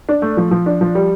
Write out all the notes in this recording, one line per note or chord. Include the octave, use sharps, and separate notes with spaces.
D4
A3
F3
F3
D4
F3
G3